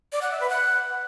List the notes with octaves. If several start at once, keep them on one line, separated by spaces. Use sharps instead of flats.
D5
F#5
E5
B4
F#5